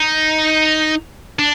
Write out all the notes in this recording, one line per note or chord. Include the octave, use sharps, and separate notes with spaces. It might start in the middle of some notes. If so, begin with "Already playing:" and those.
Already playing: D#4
D4